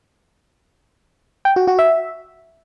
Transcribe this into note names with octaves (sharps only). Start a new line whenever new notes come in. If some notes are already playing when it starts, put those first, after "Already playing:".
G5
F#4
F#4
E5